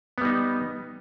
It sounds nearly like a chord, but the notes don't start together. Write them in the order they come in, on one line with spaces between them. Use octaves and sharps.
B3 G3 D#4